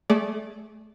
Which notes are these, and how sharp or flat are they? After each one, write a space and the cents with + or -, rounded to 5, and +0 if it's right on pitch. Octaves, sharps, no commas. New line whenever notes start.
A3 -20 G#4 +0 D5 -10